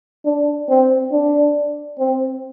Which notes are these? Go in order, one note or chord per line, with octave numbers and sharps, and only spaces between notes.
D4
C4
D4
C4